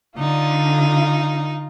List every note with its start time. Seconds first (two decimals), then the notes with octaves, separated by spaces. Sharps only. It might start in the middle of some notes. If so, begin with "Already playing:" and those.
0.18 D3 D#4 F4